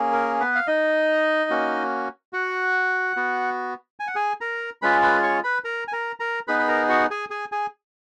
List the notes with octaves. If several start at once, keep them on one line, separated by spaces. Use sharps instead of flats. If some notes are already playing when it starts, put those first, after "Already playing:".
Already playing: A#3 C#4 G#4
A#4
B3 B4
F5
D#4 D#5
A#3 C#4 F#4
F#4 F#5
B3 F#4
G#5
F#5
G#4 G#5
A#4 A#5
G#3 C#4 F4 G#4 B4 B5
B4 B5
C#5 C#6
B4 B5
A#4 A#5
G#5
A#4 A#5
A#4 A#5
B3 D#4 G#4 B4 B5
B5
A#4 A#5
F#4 F#5
G#4 G#5
G#4 G#5
G#4 G#5